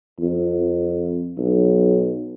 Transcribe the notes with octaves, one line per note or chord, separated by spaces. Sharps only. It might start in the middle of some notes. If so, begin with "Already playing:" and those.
F2
B1